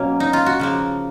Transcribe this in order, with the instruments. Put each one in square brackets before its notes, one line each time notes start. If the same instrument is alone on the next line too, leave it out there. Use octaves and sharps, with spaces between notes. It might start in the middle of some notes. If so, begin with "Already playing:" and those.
Already playing: [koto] B2 F#3 A#3 C#4
D#4
F4
F#4
C#3 F3 A#3